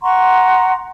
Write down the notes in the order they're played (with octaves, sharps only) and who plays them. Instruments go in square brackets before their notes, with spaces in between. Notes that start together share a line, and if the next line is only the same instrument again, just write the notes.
[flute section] F#5 A#5 C6 C#6